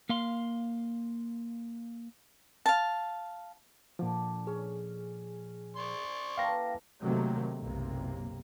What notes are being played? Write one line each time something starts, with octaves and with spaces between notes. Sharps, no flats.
A#3 F5 C6
F5 A5
A#2 D3 F3 D6
C#4 G#4
D5 C6 C#6
E3 A#3 A4 F5 G5 A#6
C3 D#3 F#3 A3 A#3
F#1 B1 C3 A#3